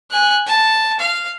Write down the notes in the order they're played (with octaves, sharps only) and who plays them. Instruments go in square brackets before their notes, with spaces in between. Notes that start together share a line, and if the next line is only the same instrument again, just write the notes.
[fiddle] G#5 F#6
A5
F5